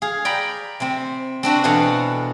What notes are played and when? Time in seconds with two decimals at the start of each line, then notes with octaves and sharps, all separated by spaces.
0.02 G#4 F5
0.25 D5 G5 A#5 B5
0.80 C3 C4
1.43 C4 D4 F#4 B4
1.64 E2 B2 F#4 A4 F5 F#5